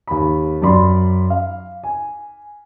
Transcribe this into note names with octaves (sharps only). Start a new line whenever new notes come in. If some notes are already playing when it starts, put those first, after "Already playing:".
D#2 B5
F#2 D5 B5 C6
F5
G#5